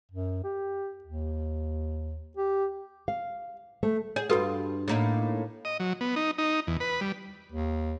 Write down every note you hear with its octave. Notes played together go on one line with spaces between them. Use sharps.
F#2
G4
D#2
G4
F5
A3
G#4 C#5
G2 F4 F#4 A4 B4
A2 A#3 D#4
D#5
F#3
B3
D#4
D#4
E2
B4
G3
D#2